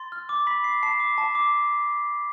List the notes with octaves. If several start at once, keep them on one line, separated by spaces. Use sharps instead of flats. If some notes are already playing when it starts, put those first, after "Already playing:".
Already playing: C6 A6
F6
D6
B5 B6
D6 C7
A5 C7
D6
A5
D6